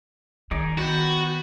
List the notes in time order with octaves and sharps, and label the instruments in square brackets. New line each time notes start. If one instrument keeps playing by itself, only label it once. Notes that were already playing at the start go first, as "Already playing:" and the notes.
[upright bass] D#3 [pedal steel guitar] D#4 G#4 D5
[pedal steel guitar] B3 G5 [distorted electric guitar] F#4